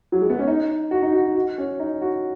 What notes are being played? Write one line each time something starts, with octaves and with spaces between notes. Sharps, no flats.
F#3
G#3
B3
C#4
D#4
F#4
D#4
F#4
F#4
C#4
D#4
F#4